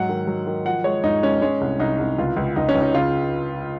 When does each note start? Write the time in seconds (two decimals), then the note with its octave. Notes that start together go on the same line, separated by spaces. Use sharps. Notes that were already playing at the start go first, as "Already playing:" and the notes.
Already playing: G#2 F#3 F#5
0.09 D#3
0.27 F#3
0.47 D#3
0.66 F3 F#5
0.84 G#3 C#5
1.04 G#2 D#4
1.23 G#3 C#4
1.42 G#3 C#4
1.61 C2
1.80 C2 D#4
1.99 C2
2.18 C#2 F4
2.36 C#2
2.56 C#2 D#4
2.69 C#4
2.75 C#2
2.81 D#4
2.94 C#3 F4